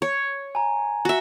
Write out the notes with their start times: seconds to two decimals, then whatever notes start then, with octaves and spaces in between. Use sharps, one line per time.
0.02 C#5
0.55 G#5 A#5
1.05 F#4 E5